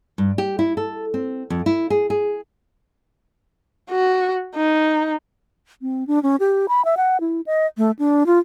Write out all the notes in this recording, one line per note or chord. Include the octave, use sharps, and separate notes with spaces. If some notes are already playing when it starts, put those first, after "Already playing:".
G2
G4
E4
A4
C4
F2
E4
G#4
G#4
F#4
D#4
C4
D4
C#4
G4
B5
E5
F#5
E4
D#5
A3
D4
F4